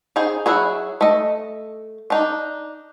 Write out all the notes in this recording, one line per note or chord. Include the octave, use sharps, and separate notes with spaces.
D#4 G#4 C5
F#3 G#3 E4 F#4 G#4
A3 D#5
D4 D#4